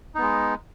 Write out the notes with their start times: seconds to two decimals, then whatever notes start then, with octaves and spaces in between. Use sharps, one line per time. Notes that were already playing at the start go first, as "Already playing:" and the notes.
0.15 D#4
0.18 B3
0.22 G#3